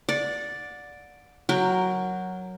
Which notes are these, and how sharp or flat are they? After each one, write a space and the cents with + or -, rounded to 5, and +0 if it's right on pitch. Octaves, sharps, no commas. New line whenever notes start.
D5 +0 F#5 -30
F#3 +0 A#4 +0 G5 +20